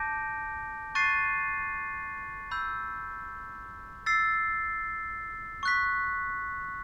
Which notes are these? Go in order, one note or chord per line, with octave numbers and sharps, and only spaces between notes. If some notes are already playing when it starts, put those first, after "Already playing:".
Already playing: A5 D6 G6 A#6 D7
C#6 F#6 A6 C7 D#7
B5 E6 G6
E6 A6 C7
C#6 F#6 B6